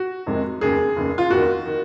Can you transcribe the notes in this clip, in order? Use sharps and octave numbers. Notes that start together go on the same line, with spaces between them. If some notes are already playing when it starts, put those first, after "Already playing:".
Already playing: F#4
F2 C3 D#3 G#3
F1 D#2 C#3 G#4
F1 D#2 C#3
F4
F1 D#2 D#3 F#4
D#3